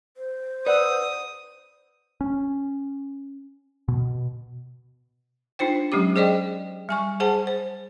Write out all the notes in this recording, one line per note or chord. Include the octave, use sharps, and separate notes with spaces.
C5
B4 D5 F#5 D#6 E6
C#4
B2
D4 D#4 F4 C5 G5
F#3 G#3 C#4 G4 D6
G#4 C5 D5 D#5 G5
G3 G#5 C#6
G#4 C5 F#5 A5
C5